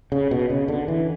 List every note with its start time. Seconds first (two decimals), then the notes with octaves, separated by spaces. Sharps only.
0.12 C#3
0.31 B2
0.50 C#3
0.68 D3
0.88 E3